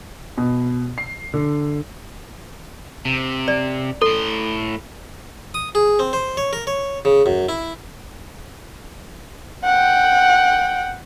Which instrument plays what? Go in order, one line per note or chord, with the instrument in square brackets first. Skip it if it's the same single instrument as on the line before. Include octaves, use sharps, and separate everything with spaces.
[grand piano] B2
C7
D3
[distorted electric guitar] C3
[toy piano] D5
[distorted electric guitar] A2 C6 [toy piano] A4
[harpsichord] D#6
G#4
C4
C5
C#5
A#4
C#5
C#3
F#2
E4
[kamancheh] F#5 G5